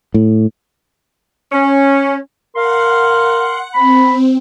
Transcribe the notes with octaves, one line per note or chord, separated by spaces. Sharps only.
A2
C#4
A#4 F5 F#5 C6
C4 B5